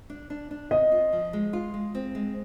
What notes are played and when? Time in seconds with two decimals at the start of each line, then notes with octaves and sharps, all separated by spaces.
0.10 D4
0.30 D4
0.51 D4
0.71 C4 D#5
0.92 F4
1.13 F3
1.33 G#3
1.53 F4
1.74 G#3
1.95 C4
2.15 G#3